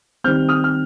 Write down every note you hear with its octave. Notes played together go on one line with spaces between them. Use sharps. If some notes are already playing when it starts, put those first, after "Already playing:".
D#3 G3 C4 F6 G6
D#6 F6
F6